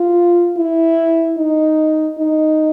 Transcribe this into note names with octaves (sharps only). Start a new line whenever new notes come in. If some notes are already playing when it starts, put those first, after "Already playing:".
Already playing: F4
E4
D#4
D#4